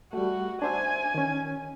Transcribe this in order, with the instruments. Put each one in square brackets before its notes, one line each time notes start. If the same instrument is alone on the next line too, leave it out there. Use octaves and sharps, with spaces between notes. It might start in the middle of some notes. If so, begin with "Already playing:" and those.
[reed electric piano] G3 A3 [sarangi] F#4
[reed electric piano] D4 C5 E5 [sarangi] G#5
[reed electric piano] D#3 C#4